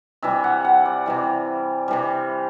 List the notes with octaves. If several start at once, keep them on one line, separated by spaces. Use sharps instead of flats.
C3 E3 G3 E5
F#5
F#5
D5
C3 E3 G3
C3 E3 G3